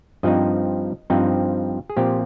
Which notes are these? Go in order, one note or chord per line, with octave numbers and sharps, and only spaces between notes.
G2 F3 C4 D#4 D#5
G2 F3 C4 D#4
G#4
A#2 F3 C4 G4